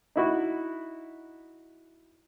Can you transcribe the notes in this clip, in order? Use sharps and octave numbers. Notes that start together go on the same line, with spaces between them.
D#4 E4 F#4